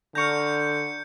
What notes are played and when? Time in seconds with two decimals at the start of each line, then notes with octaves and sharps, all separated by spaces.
0.15 D3 A#5 C#6 F6 G6 C#7